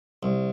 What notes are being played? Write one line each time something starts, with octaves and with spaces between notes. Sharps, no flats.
C2